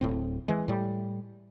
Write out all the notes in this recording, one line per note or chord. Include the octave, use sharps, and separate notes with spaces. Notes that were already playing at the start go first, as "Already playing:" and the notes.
D1 A2 C4
E3 G#3
A2 G3